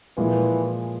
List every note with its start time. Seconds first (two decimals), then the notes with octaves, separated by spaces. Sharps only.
0.17 A#2 E3 F3 G#3